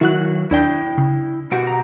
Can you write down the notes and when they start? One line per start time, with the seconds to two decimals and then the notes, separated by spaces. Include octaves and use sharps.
0.01 D#3 F#3 E4 F#4 F#6
0.51 D#2 D4 E4 G5 G6
0.98 C#3
1.52 B2 F#4 G4 D7
1.67 A#5